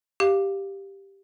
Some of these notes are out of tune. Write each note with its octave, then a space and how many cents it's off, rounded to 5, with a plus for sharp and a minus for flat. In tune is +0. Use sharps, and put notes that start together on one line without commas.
G4 +0 F5 +0